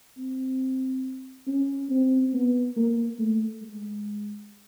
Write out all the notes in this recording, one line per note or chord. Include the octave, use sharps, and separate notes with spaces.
C4
C#4
C4
B3
A#3
A3
G#3